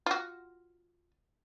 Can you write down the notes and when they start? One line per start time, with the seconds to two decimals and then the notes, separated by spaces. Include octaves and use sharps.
0.06 F4 F#4